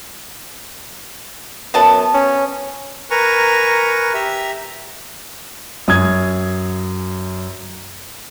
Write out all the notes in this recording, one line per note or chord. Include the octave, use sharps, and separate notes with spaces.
F#2 B3 A5
C#4
A#4 B4 G#5 A#5 C#6
G4 E5 A#5 E6
F#2 D#6 G#6